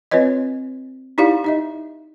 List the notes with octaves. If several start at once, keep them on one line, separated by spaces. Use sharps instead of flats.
C4 F4 B4 C#5 D#5
D#4 E4 G4 D5 F5
D#4 D#5 E5